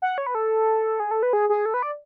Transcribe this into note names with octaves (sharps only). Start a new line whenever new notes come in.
F#5
C#5
B4
A4
G#4
A4
B4
G#4
G#4
A4
B4
D5